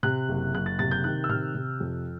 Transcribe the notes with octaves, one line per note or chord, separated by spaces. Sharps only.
C3 F#6
F#1
F#1 F#6
A6
C3 A6
G6
D#3 F#6
E6
C3 F6
C3
F2